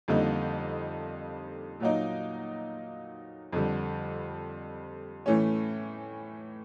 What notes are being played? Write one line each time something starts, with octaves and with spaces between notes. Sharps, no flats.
F2 D3 G3 A#3 D#4
A#2 F#3 A#3 D#4
F2 D3 G3
A2 E3 A3 C#4